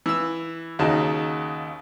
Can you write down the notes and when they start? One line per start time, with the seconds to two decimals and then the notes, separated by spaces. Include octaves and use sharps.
0.06 E3 E6
0.79 D#2 C#3 D#4 F#4 A5